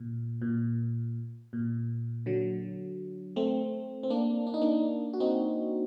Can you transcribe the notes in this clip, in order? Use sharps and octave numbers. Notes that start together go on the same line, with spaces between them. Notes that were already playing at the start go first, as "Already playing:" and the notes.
Already playing: A#2
A#2
A#2
D3 F#3
A3 C4
C4
A#3 D4
D4
D#4
A#3 D4
F#4
C4 D#4